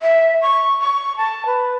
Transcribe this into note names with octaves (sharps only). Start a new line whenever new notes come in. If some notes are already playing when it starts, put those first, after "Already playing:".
E5
C#6
C#6
A5
B4